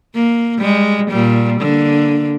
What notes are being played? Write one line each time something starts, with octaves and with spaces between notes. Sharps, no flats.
A#3
G3 G#3
A#2 G3
D3 A#3